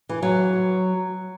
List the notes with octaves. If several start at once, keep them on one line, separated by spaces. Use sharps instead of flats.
E3
F#3